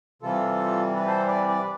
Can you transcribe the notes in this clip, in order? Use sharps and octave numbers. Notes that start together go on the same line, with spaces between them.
C3 E3 G3 F4 A4
B4
A4 C5
B4 D5
B4 D5